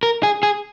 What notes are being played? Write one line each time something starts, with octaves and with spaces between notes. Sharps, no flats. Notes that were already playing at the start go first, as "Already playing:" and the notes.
A#4
G#4
G#4